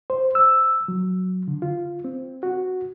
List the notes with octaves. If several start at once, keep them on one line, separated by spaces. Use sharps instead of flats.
C5
E6
F#3
D3
F4
C4
F#4